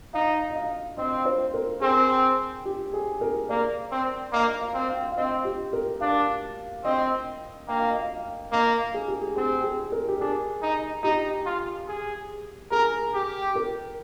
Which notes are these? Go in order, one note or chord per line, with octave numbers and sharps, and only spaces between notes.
D#4 F5
D#5
F5
C4 D#5
C5
A#4
C4 G#4
G4
G#4
A#4
A#3 D5
C4
A#3 D#5
F5
C4
F5
F5
C4 D#5
G4
A#4
D4 F5
C4 D#5
A#3 G5
F5
D#5
F5
A#3 D#5
G#4
G4
G#4
C4 G#4
G#4
A#4
G4
D4 G#4
D#4
D#4 G4
F4
G#4
G#4 A#4
G4
A#4